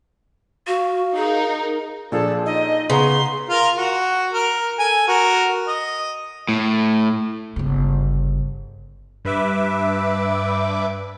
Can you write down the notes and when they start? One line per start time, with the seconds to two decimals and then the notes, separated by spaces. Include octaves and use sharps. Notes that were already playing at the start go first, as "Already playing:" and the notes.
0.67 F#4 F5
1.16 D#4 G#4 A#4
2.12 A#2 F3 D4 G#4 A4
2.46 D#4 D#5
2.90 C#3 B3 F#5 A#5 C6
3.49 F4 A#4
3.77 F#4
4.33 A#4
4.79 A4 G#5
5.08 F#4 A#4
5.68 D#5
6.49 A2
7.56 G1 C#3
9.25 G2 B4 E5 D6